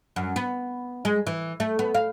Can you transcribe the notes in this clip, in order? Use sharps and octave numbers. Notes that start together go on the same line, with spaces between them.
F#2
B3
G#3
E3
A3
B3
F5